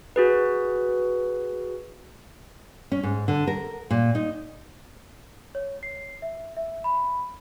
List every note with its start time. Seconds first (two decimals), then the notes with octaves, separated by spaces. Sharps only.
0.16 F#4 G#4 B4
2.92 C#4
3.03 G#2
3.28 D3
3.47 A#4
3.90 A#2
4.15 D#4
5.55 C#5
5.83 C7
6.22 E5
6.57 E5
6.84 B5